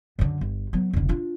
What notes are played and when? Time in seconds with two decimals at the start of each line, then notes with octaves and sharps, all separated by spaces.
0.19 F#2 D3
0.41 G1
0.73 F#3 B3
0.93 F1 D3
1.09 D4 F4